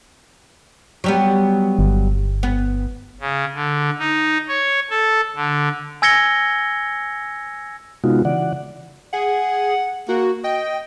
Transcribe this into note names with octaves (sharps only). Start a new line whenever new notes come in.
F#3 G3 B3
G1
B3
C#3
D3
D#4
C#5
A4
D3
G#5 E6 G#6 A#6 C#7 G7
C3 G#3 B3 D#4 F4 F#4
C#3 E3 D5 F#5
G#4 F#5
A#3 F#4
D#5 G5